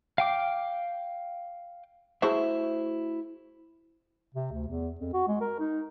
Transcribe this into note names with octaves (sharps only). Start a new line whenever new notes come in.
F5 G5 D6
A3 E4 F#4 G#4 C5 E5
C3
D2
E2
F2
F#4
G#3
A#4
D#4